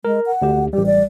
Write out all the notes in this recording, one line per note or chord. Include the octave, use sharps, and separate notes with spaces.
G#3 A#4
F#5
D2 G4
A1 G3 G4
D5